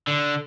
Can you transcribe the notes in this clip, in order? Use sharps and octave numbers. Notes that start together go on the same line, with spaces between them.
D3